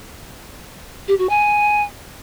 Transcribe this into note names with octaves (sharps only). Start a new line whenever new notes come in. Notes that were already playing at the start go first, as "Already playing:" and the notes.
G4
F#4
G#5